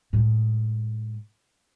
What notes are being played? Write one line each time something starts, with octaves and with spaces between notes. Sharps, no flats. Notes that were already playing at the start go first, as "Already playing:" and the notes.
A2 G#3